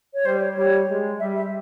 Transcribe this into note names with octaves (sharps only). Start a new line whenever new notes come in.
C#5
G3 C5
C#5
G3 C#5
G#3
G3 E5
E5